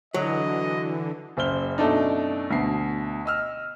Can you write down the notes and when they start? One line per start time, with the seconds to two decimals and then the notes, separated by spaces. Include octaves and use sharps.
0.14 D3 E3 F#3 D#5
1.37 F#1 C5 E5 F6 G7
1.78 F#2 B2 A3 D4 D#4
2.50 D2 B2 C7
3.26 D#5 E6 F6